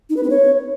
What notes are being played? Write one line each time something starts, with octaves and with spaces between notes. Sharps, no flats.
D#4
B4
C4
C#5